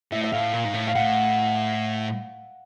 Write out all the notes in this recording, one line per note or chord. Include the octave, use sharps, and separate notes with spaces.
A2 E5
E5
A2 F5
A#2
G#2
A2
F5
A2 F#5